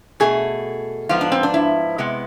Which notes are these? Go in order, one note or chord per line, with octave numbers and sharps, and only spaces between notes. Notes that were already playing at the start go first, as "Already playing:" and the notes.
B2 A3 G#4
G#2 F3 B3 F4
D4
C4
D4
E4
C3 G#3 B3